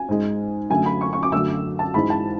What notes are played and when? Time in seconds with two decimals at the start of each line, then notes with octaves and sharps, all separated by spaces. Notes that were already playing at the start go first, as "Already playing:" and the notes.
Already playing: G#5
0.09 G#2 G#3
0.70 F#2 D3 A3 G#5
0.86 B5
1.01 C#6
1.13 C#6
1.23 D6
1.32 F#2 D3 A3 E6
1.79 A5
1.94 G#2 E3 G#3 B5
2.10 A5